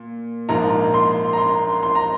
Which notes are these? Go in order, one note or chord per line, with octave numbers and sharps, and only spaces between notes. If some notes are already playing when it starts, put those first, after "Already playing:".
Already playing: A#2
A#1 G#2 F3 A#3 A#5
C6
A#5
C6
C6
A#5